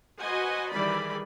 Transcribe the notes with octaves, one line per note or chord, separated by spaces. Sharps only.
F#4 B4 C5 D#5 F#5 G#5
D#3 E3 G3 G#4 D5 B5